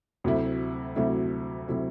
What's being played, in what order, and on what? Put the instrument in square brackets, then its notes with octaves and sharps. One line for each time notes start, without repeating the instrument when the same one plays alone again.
[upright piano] D2 C3 F#3 A3 E4
D2 C3 F#3 A3 E4
C3 F#3 A3 E4